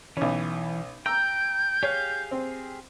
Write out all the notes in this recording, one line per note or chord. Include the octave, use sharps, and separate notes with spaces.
B1 E3 C#4
G5 A#5 E6 G6
G4 G#4 C#5 F5
C4